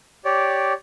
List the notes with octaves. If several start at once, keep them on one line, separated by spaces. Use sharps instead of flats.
G4 C#5 D5